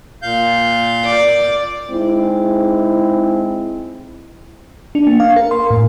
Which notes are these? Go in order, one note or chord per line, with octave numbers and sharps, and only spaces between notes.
A#2 F5 G6
D5
G#3 C4 D#4 E4
D4
A#3
F5
A#4
C6
A2